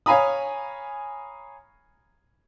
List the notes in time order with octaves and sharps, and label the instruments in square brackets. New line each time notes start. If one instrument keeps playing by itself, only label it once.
[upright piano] C#5 F5 G#5 A#5 B5 D#6